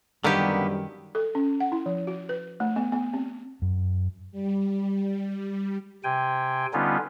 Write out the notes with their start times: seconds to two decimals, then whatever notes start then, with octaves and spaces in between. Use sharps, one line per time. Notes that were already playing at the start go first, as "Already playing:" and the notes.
0.24 F#2 D3 D#3 G3 A#3 B3 G4
1.15 A4
1.35 C#4
1.60 F#5
1.72 E4
1.86 F3
2.07 F#4
2.29 B4
2.60 A3
2.76 B3
2.92 B3
3.13 C4
3.62 F#2
4.32 G3
6.04 C3 G5 G#5
6.73 D3 G3 B3 C#4 D#4 F4